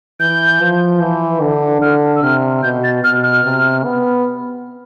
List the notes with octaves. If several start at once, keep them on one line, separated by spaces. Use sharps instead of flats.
E3 G6
F3
E3
D3
D3 F6
E6
C3 F6
B2 G6
A6
B2 F6
F6
C3
B3